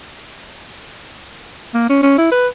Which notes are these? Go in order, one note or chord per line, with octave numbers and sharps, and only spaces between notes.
A#3
C#4
C#4
E4
B4